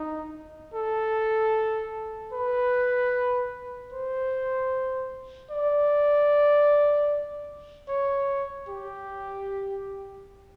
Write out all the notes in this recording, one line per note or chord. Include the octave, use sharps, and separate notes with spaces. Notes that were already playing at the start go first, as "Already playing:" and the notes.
Already playing: D#4
A4
B4
C5
D5
C#5
G4